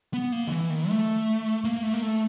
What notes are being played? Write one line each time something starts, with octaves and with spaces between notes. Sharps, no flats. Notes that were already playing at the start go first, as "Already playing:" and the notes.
B3
A#3
D#3
E3
D#3
A3
A#3
A3
A#3
A3